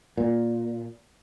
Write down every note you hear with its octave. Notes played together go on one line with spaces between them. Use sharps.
A#2